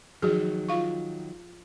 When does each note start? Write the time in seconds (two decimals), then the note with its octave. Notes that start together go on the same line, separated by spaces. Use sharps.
0.22 D#3 F3 F#3 F#4 G#4
0.68 F4 F5 C#6